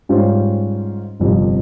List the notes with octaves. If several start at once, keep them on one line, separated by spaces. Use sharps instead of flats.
G#2 G3 C#4 F4 C5
G1 F2 C3